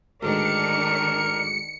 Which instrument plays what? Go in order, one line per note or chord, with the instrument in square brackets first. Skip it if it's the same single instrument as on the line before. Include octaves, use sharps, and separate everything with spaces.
[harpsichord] D2 G#2 [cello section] D#3 D4 [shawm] A#4 [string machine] C#7